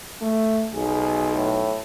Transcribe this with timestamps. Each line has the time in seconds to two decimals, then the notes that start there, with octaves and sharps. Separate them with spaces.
0.21 A3
0.74 B1 G#4
1.33 A2